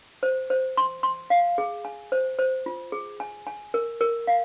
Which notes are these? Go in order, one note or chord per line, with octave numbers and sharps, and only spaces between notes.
C5
C5
C6
C6
F5
G#4
G#5
C5
C5
F4
G#4
G#5
G#5
A#4
A#4
F5